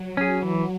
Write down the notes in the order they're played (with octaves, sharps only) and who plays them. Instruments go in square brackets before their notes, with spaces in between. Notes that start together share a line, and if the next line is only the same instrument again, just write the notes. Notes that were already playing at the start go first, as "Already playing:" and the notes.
Already playing: [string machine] F#3
[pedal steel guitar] C#4 G#4
E3